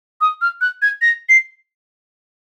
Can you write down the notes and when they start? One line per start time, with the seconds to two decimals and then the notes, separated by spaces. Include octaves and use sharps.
0.21 D#6
0.42 F6
0.61 F#6
0.82 G#6
1.02 A#6
1.29 C7